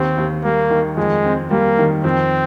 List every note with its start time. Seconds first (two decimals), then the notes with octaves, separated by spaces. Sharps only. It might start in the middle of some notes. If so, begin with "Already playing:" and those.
Already playing: D#2 C4
0.17 D#2
0.44 G3 A#3
0.70 D#3
0.97 F2 G#3
1.25 C4
1.50 G3 A#3
1.78 D#3
2.04 F2 C4